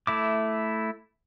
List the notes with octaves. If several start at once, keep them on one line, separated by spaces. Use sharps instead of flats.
A3 E4 D6